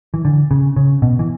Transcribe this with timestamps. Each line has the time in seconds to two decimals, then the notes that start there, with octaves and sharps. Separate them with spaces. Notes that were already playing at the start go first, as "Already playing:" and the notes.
0.14 E3
0.25 D3
0.51 C#3
0.76 C#3
1.02 B2
1.19 E3